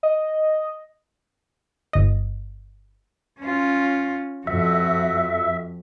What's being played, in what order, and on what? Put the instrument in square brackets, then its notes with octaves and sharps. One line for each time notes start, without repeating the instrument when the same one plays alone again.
[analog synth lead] D#5
[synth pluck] G1 D#5
[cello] C#4 F4
[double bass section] F2 [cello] F#4 [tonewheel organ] E5